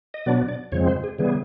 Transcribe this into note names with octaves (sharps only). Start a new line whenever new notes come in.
D#5
B2 F#3 B3 D4 D5
D5
F2 C#3 F3 G#3 C4 C#5
C5
G#4
C#3 E3 G3 B3 G#4